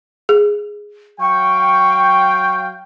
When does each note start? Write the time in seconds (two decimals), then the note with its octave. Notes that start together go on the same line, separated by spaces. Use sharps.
0.29 G#4
1.20 F#3 F5 G5 C#6